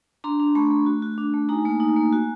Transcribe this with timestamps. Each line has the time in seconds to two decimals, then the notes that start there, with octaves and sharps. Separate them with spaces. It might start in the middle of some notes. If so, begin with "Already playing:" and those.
0.24 D4 A#5 C6
0.40 D4
0.55 A3 B5 C#6
0.71 A3
0.86 F#4
1.02 F#4
1.18 D4
1.34 A3
1.49 D#4 G#5 A#5
1.65 A#3
1.80 D#4
1.96 A#3
2.13 F#4